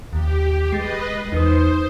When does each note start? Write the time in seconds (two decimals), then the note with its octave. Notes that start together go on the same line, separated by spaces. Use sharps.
0.13 D#2 G4
0.72 G#3 B4 D#5 A6 C7
1.32 E2 D#4 B4 C5 D#6